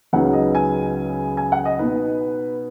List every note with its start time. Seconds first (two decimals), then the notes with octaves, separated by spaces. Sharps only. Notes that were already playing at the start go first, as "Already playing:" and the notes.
0.13 C#2 C#3 F#3 B3 D#4 F#5
0.33 D#5
0.55 G#5
1.37 G#5
1.52 F#5
1.65 D#5
1.79 B2 B3 D#4 B4